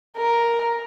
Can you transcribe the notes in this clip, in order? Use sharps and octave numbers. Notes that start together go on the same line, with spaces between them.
A#4